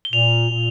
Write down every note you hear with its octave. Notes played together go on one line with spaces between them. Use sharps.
G7
A#2 F7
A#2